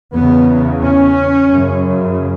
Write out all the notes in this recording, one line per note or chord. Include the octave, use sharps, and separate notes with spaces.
E2 C#3 B3
C#4
F#2 C#3